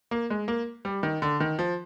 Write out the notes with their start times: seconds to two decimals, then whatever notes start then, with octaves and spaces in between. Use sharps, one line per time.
0.11 A#3
0.30 G#3
0.48 A#3
0.85 G3
1.03 D#3
1.22 D3
1.40 D#3
1.59 F3